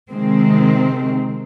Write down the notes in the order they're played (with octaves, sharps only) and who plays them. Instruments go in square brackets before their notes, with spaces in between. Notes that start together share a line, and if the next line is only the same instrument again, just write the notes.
[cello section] C3 D#3 G#3 C4